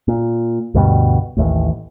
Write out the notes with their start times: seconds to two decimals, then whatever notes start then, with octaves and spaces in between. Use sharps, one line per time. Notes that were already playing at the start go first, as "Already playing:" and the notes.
0.08 A#2
0.74 D2 G2 B2 G3
1.37 A1 D#2 A2